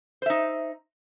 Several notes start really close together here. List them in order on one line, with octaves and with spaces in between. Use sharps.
C5 E5 D#4